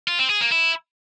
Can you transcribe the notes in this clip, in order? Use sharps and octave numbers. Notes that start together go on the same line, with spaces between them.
F4
C4
G#4
A#3
E4